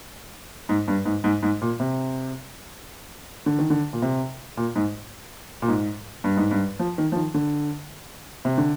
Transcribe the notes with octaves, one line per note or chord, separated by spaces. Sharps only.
G#2
G2
G#2
G#2
G#2
A#2
C3
D3
D#3
D3
A#2
C3
A#2
G#2
A#2
G#2
G2
G#2
G2
F3
D#3
F3
D#3
D3
C3
D3